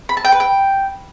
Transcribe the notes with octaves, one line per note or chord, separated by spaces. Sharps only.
B5
A5
G5
B4
G5